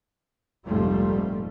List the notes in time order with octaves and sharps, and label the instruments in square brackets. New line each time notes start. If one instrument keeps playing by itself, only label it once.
[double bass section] F1 A#1 G#2 F3 G3 A3